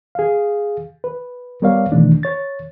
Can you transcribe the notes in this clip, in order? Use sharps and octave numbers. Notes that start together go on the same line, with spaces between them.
G#4 F5
B4
G3 B3 A#4 C#5 D5 F5
B2 D#3 E3 A3 D4
C#5 A6